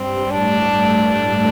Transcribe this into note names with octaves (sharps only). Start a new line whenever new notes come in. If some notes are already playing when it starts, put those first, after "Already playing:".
Already playing: G2 G3 C4
A2 A3 D4
G2 G3